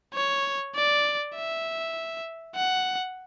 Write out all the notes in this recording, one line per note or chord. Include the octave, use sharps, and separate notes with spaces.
C#5
D5
E5
F#5